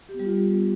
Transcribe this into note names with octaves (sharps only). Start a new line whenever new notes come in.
G4
B3
G3
F4